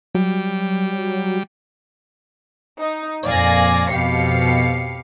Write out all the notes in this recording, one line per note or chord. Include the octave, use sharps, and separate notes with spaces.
F#3 G3
D#4
F2 A#2 D5 F5 G#5 A#6
F2 B2 G4 F5 C7 C#7